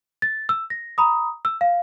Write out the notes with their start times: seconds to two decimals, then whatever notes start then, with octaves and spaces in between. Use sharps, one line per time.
0.22 A6
0.49 E6
0.70 A#6
0.98 A#5 B5 D#6
1.45 E6
1.61 F5